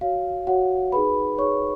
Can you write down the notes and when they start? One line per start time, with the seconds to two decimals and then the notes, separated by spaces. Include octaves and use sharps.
0.01 F#4 C#5 F5
0.47 F#4 C#5 F#5
0.92 D#4 G#4 B4 B5
1.38 D#4 G#4 B4 C#5 C#6